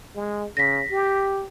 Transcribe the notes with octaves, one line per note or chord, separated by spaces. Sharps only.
G#3
C#3 A#6 B6
G4